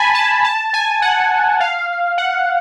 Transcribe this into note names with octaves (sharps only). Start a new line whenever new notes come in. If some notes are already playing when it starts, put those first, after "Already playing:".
Already playing: G#5 A5 B5
A5
A5
G#5
F#5
F5
F#5